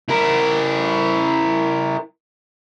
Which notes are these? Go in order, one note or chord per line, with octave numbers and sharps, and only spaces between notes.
E4 A#4